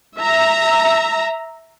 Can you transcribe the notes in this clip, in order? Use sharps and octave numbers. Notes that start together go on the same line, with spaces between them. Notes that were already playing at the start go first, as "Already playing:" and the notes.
E5 A#5